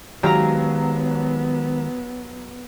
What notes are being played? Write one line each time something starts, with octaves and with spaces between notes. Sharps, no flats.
D#3 F#3 G#3 B3 G4 F5 A#5